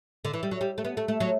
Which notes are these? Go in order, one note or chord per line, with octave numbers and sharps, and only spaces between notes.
D3
E3
G3
F#3
G3
A3
B3
A3
A3
F#3